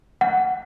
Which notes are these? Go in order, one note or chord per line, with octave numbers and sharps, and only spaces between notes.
F#5